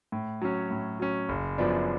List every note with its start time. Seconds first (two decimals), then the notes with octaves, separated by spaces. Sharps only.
0.12 A2
0.42 F#3 C#4
0.71 A2
1.00 F#3 C#4
1.29 F#1
1.58 F#2 F3 B3 D4